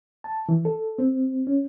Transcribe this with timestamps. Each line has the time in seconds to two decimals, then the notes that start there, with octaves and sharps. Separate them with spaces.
0.24 A5
0.49 E3
0.65 A4
0.99 C4
1.47 C#4